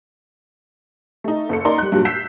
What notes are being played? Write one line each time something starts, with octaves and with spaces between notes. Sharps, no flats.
A3 D#4
F#1 A4 C#7
D#4 A#4 D5 C6
G3 F#6
G2 A#2 F#3
E6 G6 B6 C7 E7